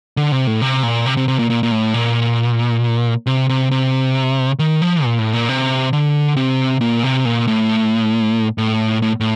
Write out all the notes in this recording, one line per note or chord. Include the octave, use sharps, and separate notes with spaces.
D3
C3
A2
C3
A#2
C3
C3
C3
A#2
A#2
A#2
A2
A#2
C3
C3
C3
D#3
F3
A#2
A2
A#2
C3
D3
C3
A#2
C3
A#2
A2
A2
A2
A2